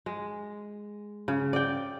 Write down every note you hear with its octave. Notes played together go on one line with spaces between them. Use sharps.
G#3
C#3
D5 G5